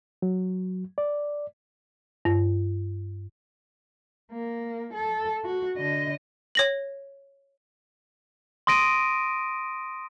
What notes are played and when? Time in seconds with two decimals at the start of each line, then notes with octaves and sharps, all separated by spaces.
0.22 F#3
0.98 D5
2.25 G2
4.31 A#3
4.93 A4
5.45 F#4
5.77 D3 D#5
6.55 C#5 A#6 F#7
8.67 C6 D#6 A#6 D7 D#7